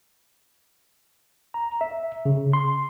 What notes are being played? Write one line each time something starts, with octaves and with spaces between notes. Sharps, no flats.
A#5
E5
C#3
C6